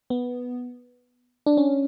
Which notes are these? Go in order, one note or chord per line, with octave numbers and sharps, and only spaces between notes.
B3
D4
C#4